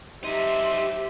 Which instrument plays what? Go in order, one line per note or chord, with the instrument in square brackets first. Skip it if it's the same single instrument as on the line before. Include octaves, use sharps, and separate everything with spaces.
[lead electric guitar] F#3 D#4 [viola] G4 C5 [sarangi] E5 [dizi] C6